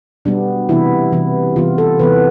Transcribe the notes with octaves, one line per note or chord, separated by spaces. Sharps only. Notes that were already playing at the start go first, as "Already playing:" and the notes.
B2 G3 B3 D4
C3 E3 B3 E4
C3 E3 B3
C3 E3 B3 F4
A4
C3 E3 B3 B4